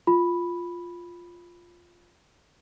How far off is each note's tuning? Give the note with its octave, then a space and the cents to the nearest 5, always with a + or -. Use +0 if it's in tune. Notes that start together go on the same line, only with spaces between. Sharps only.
F4 +0 B5 +0